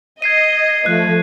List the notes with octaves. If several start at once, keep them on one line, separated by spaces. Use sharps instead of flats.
D#5 G#6 C7 D#7
F3 A3 F#6